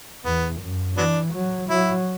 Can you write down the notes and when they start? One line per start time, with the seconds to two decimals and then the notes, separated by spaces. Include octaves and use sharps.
0.25 E2 B3
0.61 F#2
0.97 E3 F#3 B3 D4
1.34 F#3
1.70 F#3 E4